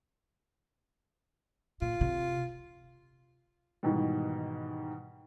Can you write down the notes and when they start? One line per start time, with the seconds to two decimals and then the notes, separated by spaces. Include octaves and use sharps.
1.82 A#2 F4
2.01 C3
3.83 G#2 B2 D#3 E3 G3